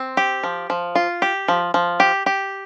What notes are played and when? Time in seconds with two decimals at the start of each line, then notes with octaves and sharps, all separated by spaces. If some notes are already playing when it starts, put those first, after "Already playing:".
Already playing: C4
0.17 G4
0.43 F3
0.70 F3
0.95 F4
1.22 G4
1.48 F3
1.74 F3
2.00 G4
2.26 G4